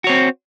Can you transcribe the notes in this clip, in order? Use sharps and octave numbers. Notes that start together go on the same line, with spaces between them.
C4 F#4 C#5